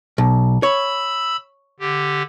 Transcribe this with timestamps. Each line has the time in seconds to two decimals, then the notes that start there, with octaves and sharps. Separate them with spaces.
0.18 B1
0.63 C#5 B5 E6
1.80 D3 G4